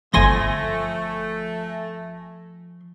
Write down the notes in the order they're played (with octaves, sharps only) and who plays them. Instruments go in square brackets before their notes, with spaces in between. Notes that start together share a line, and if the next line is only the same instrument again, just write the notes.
[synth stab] G1 G#5 A#6 [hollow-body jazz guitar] F3 C6 [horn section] A3